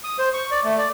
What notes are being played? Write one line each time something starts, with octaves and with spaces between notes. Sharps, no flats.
D#6
C5
C#6
D5
A3
D5